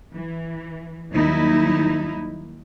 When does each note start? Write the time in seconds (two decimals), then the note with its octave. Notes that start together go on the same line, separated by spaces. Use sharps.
0.13 E3
1.12 D#2 D#3 F#3 G3 D#4 E4